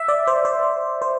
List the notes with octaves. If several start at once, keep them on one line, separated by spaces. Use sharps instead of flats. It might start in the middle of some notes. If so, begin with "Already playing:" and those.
Already playing: E5
D5
C5
C5
C5